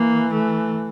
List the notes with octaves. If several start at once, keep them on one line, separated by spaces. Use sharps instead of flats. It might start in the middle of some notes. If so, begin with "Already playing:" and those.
Already playing: E3 A#3
A3